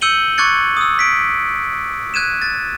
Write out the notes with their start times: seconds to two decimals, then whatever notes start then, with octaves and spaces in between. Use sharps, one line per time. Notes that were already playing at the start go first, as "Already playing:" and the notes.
0.01 E6 G6 C#7 D#7 F#7 G7
0.38 C#6 D6 F#6 G#6 A6 C#7
0.77 D#6 E6
0.99 B6 D7
2.14 F#6 G#6 D#7 E7
2.42 A6